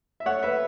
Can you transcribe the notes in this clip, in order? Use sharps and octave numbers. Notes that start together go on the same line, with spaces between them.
E5
A3 C#5 F#5
B4 E5